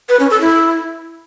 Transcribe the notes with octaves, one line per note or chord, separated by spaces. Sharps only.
B4
C#4
A4
E4